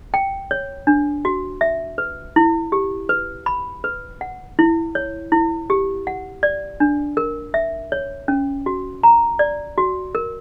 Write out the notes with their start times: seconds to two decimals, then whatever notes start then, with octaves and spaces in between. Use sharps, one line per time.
0.14 G5
0.51 C#5
0.87 D4
1.25 F#4
1.61 E5
1.98 B4
2.36 E4
2.72 G4
3.09 B4
3.46 B5
3.84 B4
4.21 F#5
4.59 E4
4.95 C#5
5.32 E4
5.70 G4
6.07 F#5
6.43 D5
6.80 D4
7.17 A#4
7.54 E5
7.92 C#5
8.28 C#4
8.66 F#4
9.03 A#5
9.39 D5
9.78 F#4
10.15 A#4